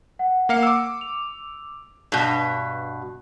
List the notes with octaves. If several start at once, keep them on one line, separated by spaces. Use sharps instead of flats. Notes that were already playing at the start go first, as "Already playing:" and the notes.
F#5
A#3 F5 C#7
D6 E6
F7
G2 B2